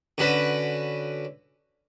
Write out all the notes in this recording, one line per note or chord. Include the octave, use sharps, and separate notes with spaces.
D3 C#4 F#4 B4